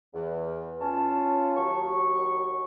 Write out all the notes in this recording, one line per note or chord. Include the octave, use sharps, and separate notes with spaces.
E2
C#4 F4 A5
D#2 F#3 C#6